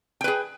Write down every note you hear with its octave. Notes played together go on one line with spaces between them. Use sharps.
G#4 B4 G5